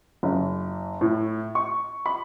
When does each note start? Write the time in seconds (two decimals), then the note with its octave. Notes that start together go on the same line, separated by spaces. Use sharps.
0.23 F#1
1.01 A2
1.55 C#6
2.06 B5